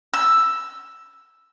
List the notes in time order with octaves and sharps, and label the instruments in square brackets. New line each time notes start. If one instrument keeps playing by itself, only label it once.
[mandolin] E6